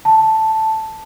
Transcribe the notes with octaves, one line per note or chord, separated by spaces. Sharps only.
A5